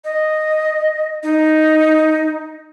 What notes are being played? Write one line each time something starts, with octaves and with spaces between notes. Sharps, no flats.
D#5
D#4